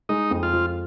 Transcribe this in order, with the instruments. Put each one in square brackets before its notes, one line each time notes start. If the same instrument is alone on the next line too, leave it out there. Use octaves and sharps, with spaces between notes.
[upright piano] G#3 [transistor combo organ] D#4
[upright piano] F2
[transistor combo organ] F4
[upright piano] F3